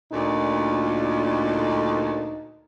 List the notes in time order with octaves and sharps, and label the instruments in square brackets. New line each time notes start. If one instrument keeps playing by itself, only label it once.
[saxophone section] D2 A#2 [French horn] D#4